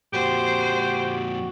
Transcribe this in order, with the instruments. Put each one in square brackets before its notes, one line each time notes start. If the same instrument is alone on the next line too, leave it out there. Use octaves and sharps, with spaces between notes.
[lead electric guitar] F2 A#2 [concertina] F#4 [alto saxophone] G4 [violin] C5